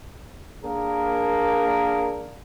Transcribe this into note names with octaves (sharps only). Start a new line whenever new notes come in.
A#3 D4 G#4 A#4